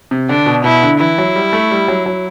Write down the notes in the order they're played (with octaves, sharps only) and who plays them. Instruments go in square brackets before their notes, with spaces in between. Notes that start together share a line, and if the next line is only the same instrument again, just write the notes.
[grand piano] C3
[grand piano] D3 [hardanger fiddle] D4
[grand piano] B2
[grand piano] B2 [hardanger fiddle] E4
[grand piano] D3
[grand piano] E3 [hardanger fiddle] E4
[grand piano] F#3
G3
A3
G3
F#3
F#3